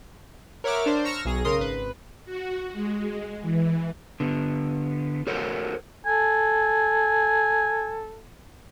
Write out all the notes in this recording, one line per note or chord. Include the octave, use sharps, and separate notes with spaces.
A#4 C#5 E5 F#5 D6 F6
D4 C5
A#5 C#6 E6 F6 A#6
B1 G#4 A#6
C#3 A#4 C6 D#6
G#1 B4
F#4
G#3
E3
D3 B3
F#4 A4 A#4 C5 C#5 F#5
A4 G#5